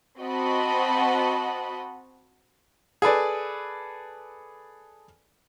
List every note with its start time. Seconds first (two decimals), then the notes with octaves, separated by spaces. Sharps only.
0.20 C4 F#4 D#5 F#5 A5 B5
3.02 G#4 A4 B4 D5